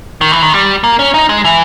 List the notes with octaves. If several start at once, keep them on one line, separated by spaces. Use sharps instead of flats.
D#3
E3
D#3
G3
A#3
C#4
D#4
G#3
E3